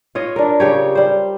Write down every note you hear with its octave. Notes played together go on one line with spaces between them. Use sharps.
F4 C#5 D#5
D4 A#4
C#3 G4 C#5
G3 C5